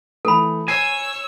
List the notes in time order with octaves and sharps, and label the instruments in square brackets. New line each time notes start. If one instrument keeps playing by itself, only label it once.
[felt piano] E3 A3 [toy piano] A4 B5
[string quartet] C#5 E6 [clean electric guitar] G#5 [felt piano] C7